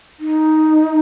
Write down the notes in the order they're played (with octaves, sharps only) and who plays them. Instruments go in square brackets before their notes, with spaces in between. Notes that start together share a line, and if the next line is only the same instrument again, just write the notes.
[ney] D#4